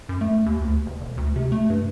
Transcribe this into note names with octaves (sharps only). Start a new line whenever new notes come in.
F#2
A3
D#2
D2
F#1
E1
D2
C3
A3
G2